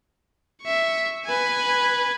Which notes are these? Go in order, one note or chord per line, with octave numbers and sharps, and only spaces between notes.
E5 C#6
B4 G#5